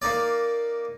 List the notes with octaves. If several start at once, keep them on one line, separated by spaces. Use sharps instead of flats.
A#3 D#4 D5